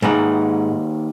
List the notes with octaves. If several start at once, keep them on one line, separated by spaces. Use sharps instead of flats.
D#2 G#2 D#4 B4 F#5